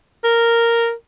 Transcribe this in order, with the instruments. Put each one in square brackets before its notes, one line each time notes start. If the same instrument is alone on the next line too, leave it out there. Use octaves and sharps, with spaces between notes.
[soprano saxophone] A#4